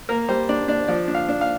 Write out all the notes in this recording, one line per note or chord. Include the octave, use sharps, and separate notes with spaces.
A#3 A#4
G3 C5
D4 D5
D4 D5
F3 D5
D4
F5
D4
F5